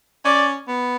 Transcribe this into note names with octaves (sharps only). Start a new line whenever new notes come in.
C#4 D5
B3